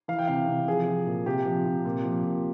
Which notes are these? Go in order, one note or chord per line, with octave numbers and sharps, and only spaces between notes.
E3 F5
G5
C3 F5
C3
F3 G#4
F3
A#2
C3 G4
F3
C3
A#2
F3
A#2